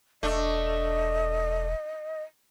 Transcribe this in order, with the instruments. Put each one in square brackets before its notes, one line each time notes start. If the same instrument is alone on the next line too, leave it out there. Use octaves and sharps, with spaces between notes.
[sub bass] E1 [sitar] A3 D4 [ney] D#5